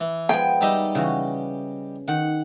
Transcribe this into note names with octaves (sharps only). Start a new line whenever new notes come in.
E3
F3 G#3 B3 G5 G#5
G3 D#4 G4 D#5 E5
C#3 E3 F#4
D#3 F#5